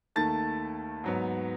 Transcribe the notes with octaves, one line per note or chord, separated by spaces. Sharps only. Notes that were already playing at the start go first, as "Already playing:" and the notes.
D#2 D#3 A3 A5 A6
G#2 F#3 B3